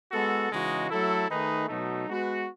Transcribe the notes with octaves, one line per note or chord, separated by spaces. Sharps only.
G#3 B3 F#4 A4
C#3 E3 G#3 D#4 F#4
F#3 A3 E4 A4
D#3 A3 D#4 G#4 B4
B2 F#3 A3 D#4
G#3 B3 F#4 B4